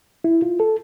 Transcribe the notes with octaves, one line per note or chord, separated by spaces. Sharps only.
E4
F4
A4